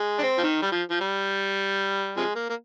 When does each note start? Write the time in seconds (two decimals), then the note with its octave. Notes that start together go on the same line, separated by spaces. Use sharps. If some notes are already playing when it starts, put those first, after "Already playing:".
Already playing: G#3
0.19 D4
0.23 C4
0.38 F3
0.43 D#3
0.62 G3
0.72 F3
0.90 F3
1.01 G3
2.17 C3 F3 G#3
2.35 A#3
2.49 A#3